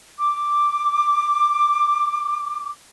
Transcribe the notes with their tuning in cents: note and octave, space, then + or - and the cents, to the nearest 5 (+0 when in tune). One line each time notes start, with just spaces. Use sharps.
D6 +5